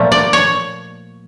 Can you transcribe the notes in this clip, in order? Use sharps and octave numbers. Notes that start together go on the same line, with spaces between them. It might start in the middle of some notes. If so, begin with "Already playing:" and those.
Already playing: A#2 F3 A3
D5
C#5